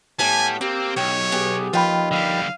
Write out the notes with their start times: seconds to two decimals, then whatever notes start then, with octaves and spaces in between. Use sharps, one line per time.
0.19 A2 G3 B3 G#5 A5
0.61 A#3 C4 G4
0.96 B1 C#5 G5
1.32 B3 G4 G#4
1.73 D#2 D#3 F3 F4 B4 G5 B5
2.11 D3 G3 F5